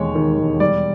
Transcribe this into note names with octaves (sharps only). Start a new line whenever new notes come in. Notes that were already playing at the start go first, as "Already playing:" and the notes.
Already playing: E1 D#2 D#3 G#3 C#5
D#3
E1
G3 D5